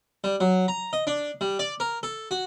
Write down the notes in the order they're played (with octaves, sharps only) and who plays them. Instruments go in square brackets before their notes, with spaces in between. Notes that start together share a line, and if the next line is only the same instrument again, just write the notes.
[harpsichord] G3
F#3
A#5
D#5
D4
G3
D5
A#4
A4
F#4